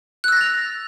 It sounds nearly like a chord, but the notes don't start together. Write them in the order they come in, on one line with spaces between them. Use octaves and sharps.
F#6 E6 A#6 A6 F7